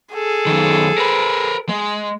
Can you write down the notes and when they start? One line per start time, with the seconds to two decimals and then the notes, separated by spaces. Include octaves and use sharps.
0.14 G#4 A4
0.47 F#2 D#3
0.98 A#4 B4
1.69 G#3